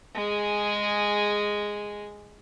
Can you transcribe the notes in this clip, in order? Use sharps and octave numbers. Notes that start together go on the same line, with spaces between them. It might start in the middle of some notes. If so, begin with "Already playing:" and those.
G#3 G#4